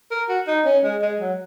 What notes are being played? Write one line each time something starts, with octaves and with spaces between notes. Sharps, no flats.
A#4
F#4
D#4
C#4
G#3
G#3
F#3